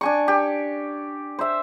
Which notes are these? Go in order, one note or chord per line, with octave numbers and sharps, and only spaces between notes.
D4 G#5 C#6
G4
C5 E5